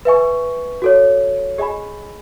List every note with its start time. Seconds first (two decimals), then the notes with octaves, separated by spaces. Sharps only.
0.05 B4 E5 G#5 C#6
0.82 F#4 A4 C#5
1.58 G#4 D#5 G#5 B5